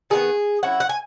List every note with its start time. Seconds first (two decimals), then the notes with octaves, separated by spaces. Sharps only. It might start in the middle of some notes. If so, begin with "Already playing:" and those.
0.10 D#3 G#3 B3 G#4
0.63 F#3 C#4 E4 F#5
0.80 F#5
0.89 G#5